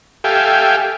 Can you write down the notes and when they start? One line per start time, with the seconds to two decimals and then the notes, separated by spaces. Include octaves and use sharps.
0.24 G4 A4 E5 F5 G5 G#5